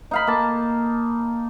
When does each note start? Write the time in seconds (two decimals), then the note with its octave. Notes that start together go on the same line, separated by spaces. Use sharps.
0.11 D#4 F5 B5
0.27 A#3 A5